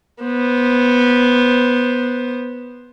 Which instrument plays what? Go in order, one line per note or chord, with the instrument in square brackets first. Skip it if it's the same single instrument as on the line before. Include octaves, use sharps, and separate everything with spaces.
[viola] B3 C5